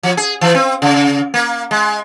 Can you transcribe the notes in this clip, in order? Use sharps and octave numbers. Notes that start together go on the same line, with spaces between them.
F3
G#4
E3
C4
C#3
A#3
G#3